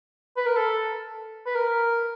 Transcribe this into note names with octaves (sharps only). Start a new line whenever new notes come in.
B4
A#4
A4
B4
A#4